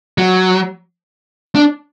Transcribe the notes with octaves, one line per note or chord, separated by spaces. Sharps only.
F#3
D4